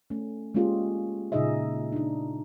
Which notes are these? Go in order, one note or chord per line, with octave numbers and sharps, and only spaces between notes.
A3 C#4
G#3 A#3 C#4 F4 G4 G#4
A#2 C#3 D#4 G#4 D#5 E5
D4 D#4